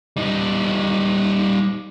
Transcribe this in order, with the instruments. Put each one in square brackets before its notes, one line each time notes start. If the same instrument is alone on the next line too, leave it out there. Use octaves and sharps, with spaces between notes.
[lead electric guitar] G3 D#4